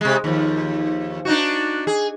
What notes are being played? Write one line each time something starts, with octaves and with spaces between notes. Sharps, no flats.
C3 G#3
D#2 F3
D4 D#4 F#4
G#4